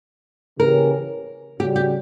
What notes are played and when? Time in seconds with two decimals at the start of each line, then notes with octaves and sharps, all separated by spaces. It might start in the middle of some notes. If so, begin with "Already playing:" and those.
0.59 C#3 E3 A#3 C#4 G4 A#4
1.60 C#3 G3 C#4 F#4 G4
1.76 G4